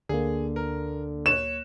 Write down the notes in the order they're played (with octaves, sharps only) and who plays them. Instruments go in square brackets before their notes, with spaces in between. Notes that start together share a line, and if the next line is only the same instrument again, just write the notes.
[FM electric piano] D2 A#3 [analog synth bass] D3 [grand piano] G#4
[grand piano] A#4
[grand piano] C#5 [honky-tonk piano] E7